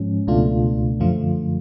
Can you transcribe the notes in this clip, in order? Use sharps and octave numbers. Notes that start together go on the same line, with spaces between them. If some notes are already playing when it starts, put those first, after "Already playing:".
Already playing: G#2 F3 G#3 C#4
C#2 B2 A3 D4 F4
F#2 D3 F3 A3 F4